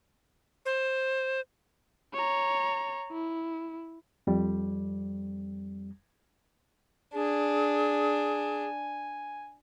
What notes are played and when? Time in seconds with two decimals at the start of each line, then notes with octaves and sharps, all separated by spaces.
0.66 C5
2.14 C#5 A#5
3.12 E4
4.27 F2 G3
7.14 D4 G#4 G#5